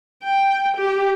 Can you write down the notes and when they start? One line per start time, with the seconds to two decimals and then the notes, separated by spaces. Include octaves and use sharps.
0.24 G5
0.77 G4